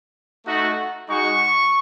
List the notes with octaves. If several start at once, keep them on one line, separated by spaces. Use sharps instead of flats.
A3 D#4 F#4
G#3 D#4 F#4 C#6